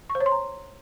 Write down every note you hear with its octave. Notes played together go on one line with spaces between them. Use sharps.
C#6
C5
C#5
C6
A#5